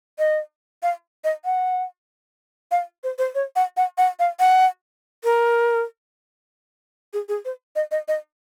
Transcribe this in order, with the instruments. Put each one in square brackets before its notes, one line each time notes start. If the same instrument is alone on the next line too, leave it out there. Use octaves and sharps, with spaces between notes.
[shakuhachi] D#5
F5
D#5
F#5
F5
C5
C5
C#5
F#5
F#5
F#5
F5
F#5
A#4
G#4
G#4
C5
D#5
D#5
D#5